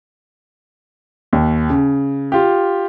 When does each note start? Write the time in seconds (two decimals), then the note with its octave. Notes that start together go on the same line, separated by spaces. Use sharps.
1.33 D#2
1.70 C#3
2.32 F4 G4